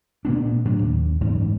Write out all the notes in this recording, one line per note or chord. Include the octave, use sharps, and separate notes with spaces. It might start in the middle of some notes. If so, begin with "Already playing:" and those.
A#2 A#3 B3 D4
A2 F#3 D4
D#2
F#1 G#2 E3